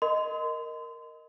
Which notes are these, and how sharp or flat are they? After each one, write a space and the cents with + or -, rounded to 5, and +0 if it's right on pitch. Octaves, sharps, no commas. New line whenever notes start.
A#4 +0 D#5 +0 C6 -30